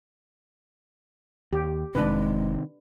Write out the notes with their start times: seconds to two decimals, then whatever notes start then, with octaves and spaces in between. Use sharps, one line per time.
1.53 D#2 G4
1.95 F1 C3 D#3 G#3 D4 B4